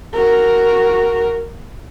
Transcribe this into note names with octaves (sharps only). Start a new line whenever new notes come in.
F#4 A#4